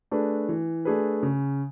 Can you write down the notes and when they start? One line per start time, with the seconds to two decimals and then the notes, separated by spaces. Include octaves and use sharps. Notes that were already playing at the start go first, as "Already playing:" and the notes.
0.11 A3 D4 G#4 B4
0.49 E3
0.85 A3 D4 G#4 B4
1.23 C#3